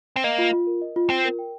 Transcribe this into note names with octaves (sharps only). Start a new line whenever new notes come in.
C4
A#3 D#5
F4
F4
A#4
D#5
F4
C4 F4
A#4
G5